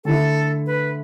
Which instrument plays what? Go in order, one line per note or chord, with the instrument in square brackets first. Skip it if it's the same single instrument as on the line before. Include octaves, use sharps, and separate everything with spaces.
[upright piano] D3 A3 E4 [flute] A4
[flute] B4